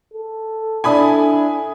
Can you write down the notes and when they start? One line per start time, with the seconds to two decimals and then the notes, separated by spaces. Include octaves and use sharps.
0.14 A4
0.84 D4 E4 G#5 B5 D#6